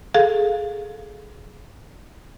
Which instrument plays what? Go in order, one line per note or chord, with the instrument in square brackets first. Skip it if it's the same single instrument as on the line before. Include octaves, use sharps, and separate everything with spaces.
[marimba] G#4 A4 F5